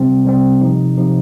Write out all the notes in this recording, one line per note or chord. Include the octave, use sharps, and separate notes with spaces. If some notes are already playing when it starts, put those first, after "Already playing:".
Already playing: C3 G3 C4
C3 G3 C4
C3 F3 D#4
C3 F3 D#4